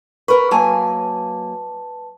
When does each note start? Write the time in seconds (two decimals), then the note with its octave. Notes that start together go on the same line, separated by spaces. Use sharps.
0.28 A#4 B4 C#6
0.51 F#3 A#3 B4 G#5 A5